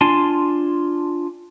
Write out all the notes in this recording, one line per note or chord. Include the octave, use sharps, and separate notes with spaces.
D4 F4 G#5 A5 C6